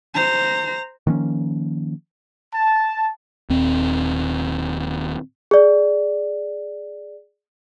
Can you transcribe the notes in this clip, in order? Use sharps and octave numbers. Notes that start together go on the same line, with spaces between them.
C5 A#5
D#3 F3 A#3 C#4
A5
D#1 D#2 C4
G#4 D5